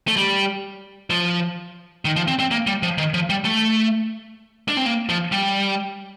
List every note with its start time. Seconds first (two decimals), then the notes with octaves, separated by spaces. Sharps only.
0.08 A3
0.16 G3
1.10 F3
2.05 D#3
2.16 F3
2.28 C4
2.39 C4
2.51 A#3
2.67 G3
2.83 F3
2.98 D#3
3.14 F3
3.30 G3
3.45 A3
4.68 D4
4.77 C4
4.86 A#3
5.09 F3
5.32 G3